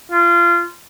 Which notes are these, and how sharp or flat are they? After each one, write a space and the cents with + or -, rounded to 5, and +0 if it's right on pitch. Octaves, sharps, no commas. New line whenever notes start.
F4 -25